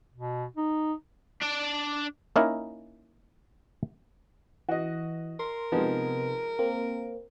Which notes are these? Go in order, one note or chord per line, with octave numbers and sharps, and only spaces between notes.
B2
D#4
D4 D5
A#3 C#4 D#4 E4 A#4
E3 F#4 D#5
A#4 C6
C3 F3 G#3 B3 D#4
A#3 C4